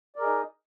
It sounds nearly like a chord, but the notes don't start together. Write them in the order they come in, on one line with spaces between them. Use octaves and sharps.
D5 A#4 G#4 D#5 D#4